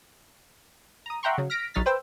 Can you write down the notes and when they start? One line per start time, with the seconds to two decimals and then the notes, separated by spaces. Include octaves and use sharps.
1.06 A#5 D#6
1.23 E5 F#5 G5 A#5 C6 C#6
1.38 C#3 F#3
1.50 F6 A#6 B6 D7
1.74 A#1 F#3 D#4 F6 A6 B6
1.86 B4 C5 G5 E6